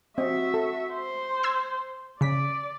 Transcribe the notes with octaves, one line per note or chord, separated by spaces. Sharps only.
C4 F#4 D#5 E5
A4
C5
C6 E6 G#6
C#3 D5 B6